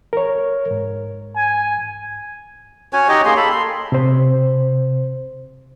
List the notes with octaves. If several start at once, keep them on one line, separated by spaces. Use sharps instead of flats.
A#4 C#5
G#2
G#5
C#4 F#4 C#5 G#5
D#4 G4 C#5 D#5
A#3 G#4 C6
A4 B5
C6
C3 C5